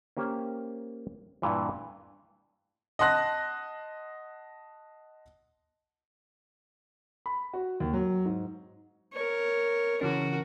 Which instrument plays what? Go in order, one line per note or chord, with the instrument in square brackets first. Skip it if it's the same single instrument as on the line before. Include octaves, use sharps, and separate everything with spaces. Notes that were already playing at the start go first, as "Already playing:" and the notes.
[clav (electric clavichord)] A#3 C#4 G4 C5
G2 A#2 E3
[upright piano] D#5 F#5 A5 C6 F#6 A#6
[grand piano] B5
F#4
D#2
F#3
G#2
[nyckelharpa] A#4 C#5
[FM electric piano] C#3 E3 C#4 [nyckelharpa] F#4 A#4